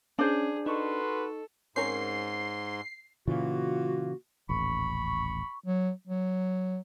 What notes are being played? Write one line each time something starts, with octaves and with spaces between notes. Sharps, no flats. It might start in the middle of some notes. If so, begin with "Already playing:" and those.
C#4 D4 G#4 C5
D#4 F#4 A4 B4 C6 C#6
G#2 C4 C#4 A#4 C6 C7
A#2 C#3 E3 A#3 F4 F#4
D#1 A1 B5 C#6
F#3
F#3